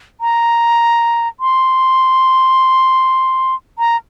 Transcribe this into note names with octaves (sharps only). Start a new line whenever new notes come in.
A#5
C6
A#5